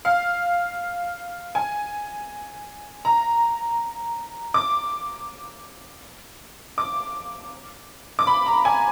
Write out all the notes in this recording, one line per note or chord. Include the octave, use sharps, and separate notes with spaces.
F5
G#5
A#5
D6
D6
D6
B5
A#5
G#5